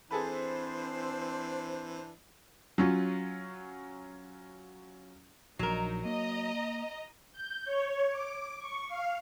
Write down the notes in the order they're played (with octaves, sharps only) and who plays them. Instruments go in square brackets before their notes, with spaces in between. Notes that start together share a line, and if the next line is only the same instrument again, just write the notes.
[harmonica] E3 D4 [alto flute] C4 [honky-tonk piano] G#4 A4 B4 [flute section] C5
[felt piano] F#3 C#4 F4
[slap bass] A#1 A#2 [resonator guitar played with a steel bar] F#3 A#4 [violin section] D#4
[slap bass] A#3 [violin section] D#5 A#5
[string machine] G6
C#5
D6
C#6
F5